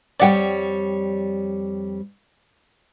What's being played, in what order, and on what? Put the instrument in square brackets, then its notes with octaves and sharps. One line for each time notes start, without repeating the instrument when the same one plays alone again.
[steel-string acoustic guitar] F2 G3 C#5 [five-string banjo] D5 F#5 G5